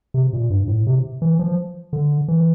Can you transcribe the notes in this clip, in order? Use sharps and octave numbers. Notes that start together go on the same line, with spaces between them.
C3
A#2
G2
A2
C3
E3
F3
D3
E3